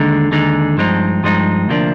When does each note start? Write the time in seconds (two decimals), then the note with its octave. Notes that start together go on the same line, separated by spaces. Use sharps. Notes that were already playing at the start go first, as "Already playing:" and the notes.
Already playing: D#2 D3 G#3 D#4
0.31 D#2 D3 G#3 D#4
0.77 G2 F3 G#3 C4 D#4
1.23 G2 F3 G#3 C4 D#4
1.68 D2 C3 F3 A#3 D4